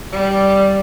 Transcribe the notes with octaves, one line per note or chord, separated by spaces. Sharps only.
G3